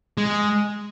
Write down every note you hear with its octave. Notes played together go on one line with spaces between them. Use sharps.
G#3